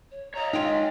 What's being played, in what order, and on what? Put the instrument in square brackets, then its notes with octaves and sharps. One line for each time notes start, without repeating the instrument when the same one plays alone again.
[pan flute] C#5
[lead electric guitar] C#5 D#5 [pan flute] A#5
[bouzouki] G#3 F4 [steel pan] D#4 [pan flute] G5